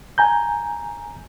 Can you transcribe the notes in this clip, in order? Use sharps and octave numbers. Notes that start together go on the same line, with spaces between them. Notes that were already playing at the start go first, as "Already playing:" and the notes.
G#5 A#5 G6